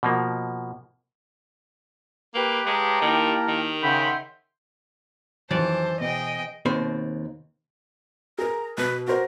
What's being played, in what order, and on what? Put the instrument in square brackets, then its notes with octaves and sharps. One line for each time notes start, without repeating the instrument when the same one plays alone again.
[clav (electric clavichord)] B2 F3 A#3
[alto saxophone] A#3 [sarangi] G4 [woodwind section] B4
[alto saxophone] G#3 [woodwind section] G#4 B4 C#5 [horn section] F5 A5 A#5
[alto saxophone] D#3 [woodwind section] A#3 E4 A#4
[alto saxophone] D#3
[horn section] C#3 B5 [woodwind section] E5 F#5 G5 [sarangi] C6
[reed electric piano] F2 D#3 F#3 [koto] E3 C#4 D5 [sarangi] C5 [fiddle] A5
[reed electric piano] B2 B3 [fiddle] G#4 G5 [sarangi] D#5
[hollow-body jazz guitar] D#2 B2 C4 C5 B5
[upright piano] G#4 A#4 [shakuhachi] A#5
[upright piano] B2 [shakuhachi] B4
[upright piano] F#4 C5 [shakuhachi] A#4